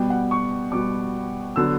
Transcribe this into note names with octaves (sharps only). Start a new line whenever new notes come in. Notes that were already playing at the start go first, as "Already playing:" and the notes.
Already playing: B2 G3 B3 G5
F#5
C#6
B2 G3 B3 D6
D3 F#3 B3 E6